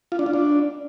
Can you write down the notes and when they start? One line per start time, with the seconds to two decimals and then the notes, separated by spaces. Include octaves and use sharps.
0.12 F4
0.19 D4
0.26 F4
0.33 D4